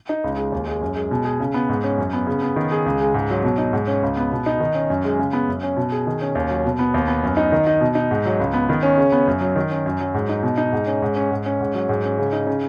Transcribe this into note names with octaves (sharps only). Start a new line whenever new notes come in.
D#4
C#2
G#3
D#2
G#3
F#2
G#3
B2
G#4
C#3
B3
G#2
C#4
F#2
B3
C#3
B3
D#3
G#4
C#2
G#3
G#2
F#3
B2
D#4
G#2
C#4
C#2
B3
B2
D#4
D#3
C#4
F#2
G#3
C#3
B3
F#2
C#4
B2
G#4
D#3
C#4
D#2
F#3
B2
B3
D#2
B3
F#2
D#4
D#3
D#4
B2
D#4
G#2
F#3
C#2
B3
D#3
C#4
C#3
B3
F#2
F#3
D#3
C#4
F#2
F#3
G#2
D#4
B2
D#4
G#2
C#4
G#2
C#4
G#2
C#4
G#2
F#3
G#2
C#4
C#3
D#4
C#3